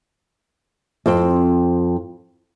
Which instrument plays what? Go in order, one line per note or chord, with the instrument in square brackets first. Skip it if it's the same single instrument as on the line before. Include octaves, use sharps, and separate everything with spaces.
[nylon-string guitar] F2 C4